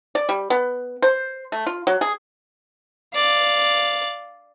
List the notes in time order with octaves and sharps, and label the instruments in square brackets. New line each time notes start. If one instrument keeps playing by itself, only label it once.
[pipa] D5
G3
B3
C5
A3
F4
F#3
G#4
[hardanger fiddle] D5 F5